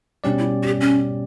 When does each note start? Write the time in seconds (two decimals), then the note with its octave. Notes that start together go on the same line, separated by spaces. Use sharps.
0.24 B2 G3 C#4 D4 G4 D5
0.38 E4
0.63 F#4
0.66 G4
0.81 C#4